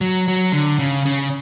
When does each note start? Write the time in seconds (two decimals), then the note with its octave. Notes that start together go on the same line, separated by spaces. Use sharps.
0.01 F#3
0.28 F#3
0.53 D3
0.79 C#3
1.06 C#3